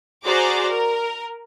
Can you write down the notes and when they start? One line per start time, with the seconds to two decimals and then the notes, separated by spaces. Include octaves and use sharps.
0.25 F#4 G#4 C5 D5 A#5 D6
0.69 A#4